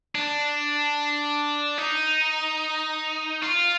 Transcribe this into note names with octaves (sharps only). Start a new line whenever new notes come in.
D4
D#4
F4